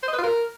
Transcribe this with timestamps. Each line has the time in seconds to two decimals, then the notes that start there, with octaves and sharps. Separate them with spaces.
0.03 C5
0.08 D#5
0.13 B4
0.18 F4
0.23 A#4